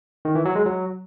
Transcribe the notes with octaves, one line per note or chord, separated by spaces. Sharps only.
D#3
E3
F#3
G#3
F#3